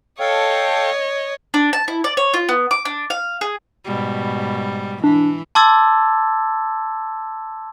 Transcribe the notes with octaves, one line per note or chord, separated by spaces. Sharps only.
A4 C#5 D#5 F5 G5
D4
A5
E4
D5
C#5
F4
B3
D6
D4
F5
G#4
G#2 B2 G3
E3 D4
A5 C6 D6 E6 G#6 A6